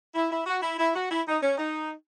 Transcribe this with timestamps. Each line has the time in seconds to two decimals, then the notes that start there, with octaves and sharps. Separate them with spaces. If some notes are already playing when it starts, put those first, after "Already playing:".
0.15 E4
0.31 E4
0.46 F#4
0.63 E4
0.79 E4
0.95 F#4
1.11 E4
1.27 D#4
1.42 C#4
1.58 D#4